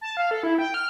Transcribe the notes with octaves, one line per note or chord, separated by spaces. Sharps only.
A5
F5
A4
E4
G5
F6